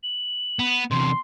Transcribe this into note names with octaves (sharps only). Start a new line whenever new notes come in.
F#7
B3
E2 C3 C6